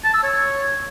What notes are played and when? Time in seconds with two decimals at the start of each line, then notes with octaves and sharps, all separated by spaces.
0.04 A5
0.14 E6
0.24 C#5